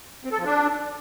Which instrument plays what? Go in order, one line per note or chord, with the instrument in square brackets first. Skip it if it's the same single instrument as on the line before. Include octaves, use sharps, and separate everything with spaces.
[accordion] C4
A4
F3
D4